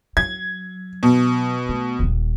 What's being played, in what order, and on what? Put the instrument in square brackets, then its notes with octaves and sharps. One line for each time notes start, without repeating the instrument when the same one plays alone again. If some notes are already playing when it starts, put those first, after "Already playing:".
[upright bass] F#3 [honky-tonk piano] G#6
[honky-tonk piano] B2
[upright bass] A3
D#1 G3